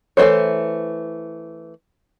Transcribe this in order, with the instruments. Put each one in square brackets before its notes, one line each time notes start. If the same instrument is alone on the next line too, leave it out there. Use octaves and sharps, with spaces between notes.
[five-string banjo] E3 A3 B3 C5 C#5